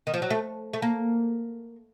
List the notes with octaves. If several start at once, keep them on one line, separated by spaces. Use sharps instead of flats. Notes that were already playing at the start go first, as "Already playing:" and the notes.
D#3
F3
F#3
A3
A3
A#3